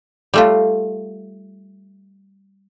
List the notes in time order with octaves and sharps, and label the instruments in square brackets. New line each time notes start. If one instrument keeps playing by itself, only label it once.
[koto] G3 A3 F4